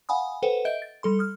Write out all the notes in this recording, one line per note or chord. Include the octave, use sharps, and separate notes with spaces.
F5 F#5 G#5 B5 D#6
A4 B4 C5 F#5 G5
D#5 E5 G6 D7
A6
G3 A4 C6
D#6 F6